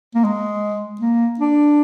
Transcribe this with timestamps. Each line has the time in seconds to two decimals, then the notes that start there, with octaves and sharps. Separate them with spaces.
0.15 A#3
0.24 G#3
1.01 A#3
1.39 D4